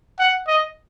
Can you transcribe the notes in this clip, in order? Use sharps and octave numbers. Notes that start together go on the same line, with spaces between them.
F#5
D#5